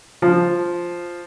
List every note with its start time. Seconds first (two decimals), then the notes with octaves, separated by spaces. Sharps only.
0.22 F3